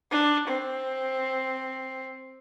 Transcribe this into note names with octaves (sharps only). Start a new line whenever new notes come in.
D4
C4